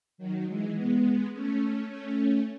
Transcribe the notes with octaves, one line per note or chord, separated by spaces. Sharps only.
D#3 F#3
E3 G#3
G#3 B3
A3 C#4
A3 C#4